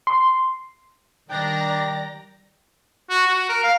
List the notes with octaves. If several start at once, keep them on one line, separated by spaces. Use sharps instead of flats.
C6
D#3 G3 D4 D5 G5 A#5 A#6
F#4
F#4
A#4
F5